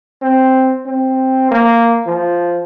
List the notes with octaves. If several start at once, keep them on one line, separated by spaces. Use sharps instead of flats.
C4
C4
A#3
F3